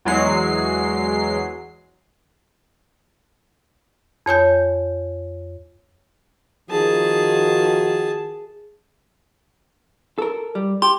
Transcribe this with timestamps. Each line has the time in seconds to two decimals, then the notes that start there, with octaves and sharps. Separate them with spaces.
0.05 E2 F#3 G#3 C7
4.26 F2 C#5 G#5 G6
6.70 D#3 F3 F#4 G#4 A5
10.18 A4 A#4
10.55 G3
10.82 G4 C6